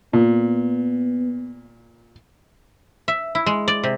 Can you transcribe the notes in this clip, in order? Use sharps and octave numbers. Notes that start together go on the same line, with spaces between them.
A#2 B3
E5
E4
G#3
D5
C3